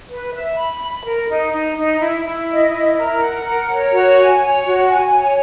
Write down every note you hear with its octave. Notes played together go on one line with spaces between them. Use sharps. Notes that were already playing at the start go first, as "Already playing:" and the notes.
B4
E5
B5
B5
A#4
D#4
D#4
D#4
E4
E4
D#5
E4
A#4
F#5
A#4
C#5
F#4
G#5
C#5
F#4
G#5
C#5